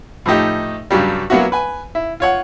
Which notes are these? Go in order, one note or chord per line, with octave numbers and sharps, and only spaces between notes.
A2 F3 A3 D#4 G4
G2 C#3 F#3 G3
F#3 A#3 B3 C#4 E4 F#4
B4 G#5
E4
F4 C#5 F#5